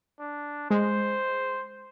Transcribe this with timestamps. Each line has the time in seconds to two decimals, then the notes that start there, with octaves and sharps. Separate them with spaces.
0.20 D4
0.70 G#3 C5